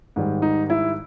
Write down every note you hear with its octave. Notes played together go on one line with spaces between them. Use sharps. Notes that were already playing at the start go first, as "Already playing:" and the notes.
G#2 D#3 G3
D#4
E4